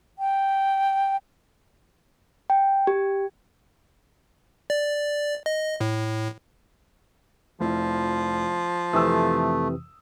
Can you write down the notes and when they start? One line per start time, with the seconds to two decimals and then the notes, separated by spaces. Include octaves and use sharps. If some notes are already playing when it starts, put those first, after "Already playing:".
0.19 G5
2.50 G5
2.87 G4
4.70 D5
5.46 D#5
5.81 A2
7.60 F1 F3 E4
8.93 F2 C3 E3 A3 D#6 E6